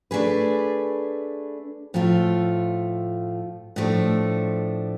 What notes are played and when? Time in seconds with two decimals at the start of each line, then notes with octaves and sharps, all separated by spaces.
0.11 A3 D4 G#4 B4
1.94 A2 F3 A3 F4
3.76 A2 F3 A3 D4